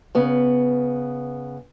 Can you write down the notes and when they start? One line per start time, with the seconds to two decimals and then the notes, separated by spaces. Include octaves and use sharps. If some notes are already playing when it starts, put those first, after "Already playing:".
0.15 C#3 B3